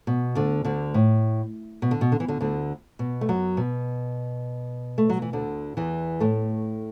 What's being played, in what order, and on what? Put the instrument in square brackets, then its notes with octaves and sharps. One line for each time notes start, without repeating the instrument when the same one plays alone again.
[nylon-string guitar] B2
D2 D3
D2 D3
A2
B2
D3
B2
D3
E3
D2 D3
D2 D3
B2
A3
F#2 F#3
B2
A3
F#3
E3
D2 D3
E2 E3
A2 A3